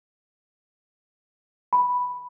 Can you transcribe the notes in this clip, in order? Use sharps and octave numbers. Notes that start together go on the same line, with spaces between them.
B5